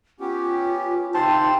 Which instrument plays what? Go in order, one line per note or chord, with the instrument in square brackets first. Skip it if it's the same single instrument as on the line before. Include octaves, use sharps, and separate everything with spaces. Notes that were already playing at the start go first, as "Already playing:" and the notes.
[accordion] B3 C#4 G4 [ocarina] F4
[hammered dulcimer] C3 F3 C4 [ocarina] D#4 [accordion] C5 C6 [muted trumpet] A5